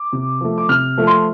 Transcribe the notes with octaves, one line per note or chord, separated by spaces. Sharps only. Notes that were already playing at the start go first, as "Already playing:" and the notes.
Already playing: D6
C3
F3 A3
D6
C3 F6
F3 A3
C6